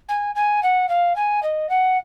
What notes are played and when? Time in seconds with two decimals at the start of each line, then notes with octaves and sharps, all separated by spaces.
0.08 G#5
0.35 G#5
0.63 F#5
0.89 F5
1.16 G#5
1.42 D#5
1.69 F#5